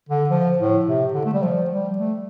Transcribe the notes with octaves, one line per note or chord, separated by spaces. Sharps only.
D3
F3
A2
C3
D3
A3
G3
F3
G3
A3